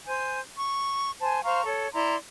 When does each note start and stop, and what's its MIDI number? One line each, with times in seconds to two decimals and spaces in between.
0.06 0.40 72
0.06 0.40 80
0.06 0.40 91
0.56 1.12 85
1.21 1.40 72
1.21 1.40 80
1.21 1.40 81
1.44 1.64 72
1.44 1.64 77
1.44 1.64 82
1.44 1.64 85
1.65 1.88 69
1.65 1.88 73
1.94 2.15 64
1.94 2.15 74
1.94 2.15 82
1.94 2.15 84